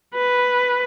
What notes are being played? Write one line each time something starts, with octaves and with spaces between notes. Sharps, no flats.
B4